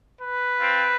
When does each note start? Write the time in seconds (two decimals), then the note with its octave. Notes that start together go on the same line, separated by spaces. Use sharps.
0.20 B4
0.58 C4 F4